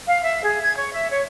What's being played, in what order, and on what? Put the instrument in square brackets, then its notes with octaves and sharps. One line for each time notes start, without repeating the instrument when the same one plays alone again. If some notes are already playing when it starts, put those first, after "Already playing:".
[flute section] F5
E5
G#4
G#6
C#5
E5
C#5